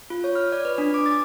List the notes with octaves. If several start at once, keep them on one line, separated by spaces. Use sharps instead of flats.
F4
C#5
F6
D5
B4
D4
D6
A6